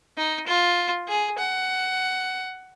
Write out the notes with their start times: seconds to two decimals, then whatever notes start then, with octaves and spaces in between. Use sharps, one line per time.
0.17 D#4
0.47 F4
1.08 G#4
1.39 F#5